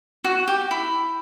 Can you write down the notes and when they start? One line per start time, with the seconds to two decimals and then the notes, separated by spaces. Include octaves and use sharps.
0.24 F#4
0.48 G4
0.71 E4